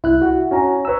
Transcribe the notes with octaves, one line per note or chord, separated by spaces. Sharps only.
C2 E4 F#6
F#4 F#5
C#4 F#4 G#5 A#5
B4 C#5 A#5 E6